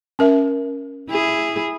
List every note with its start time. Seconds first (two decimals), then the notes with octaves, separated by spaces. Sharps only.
0.19 C#4 A#4 E5
1.10 E4 G#4